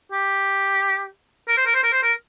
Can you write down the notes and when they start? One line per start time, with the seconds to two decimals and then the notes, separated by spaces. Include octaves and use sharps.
0.12 G4
1.48 A#4
1.57 C5
1.66 A#4
1.75 C5
1.83 A#4
1.93 C5
2.03 A#4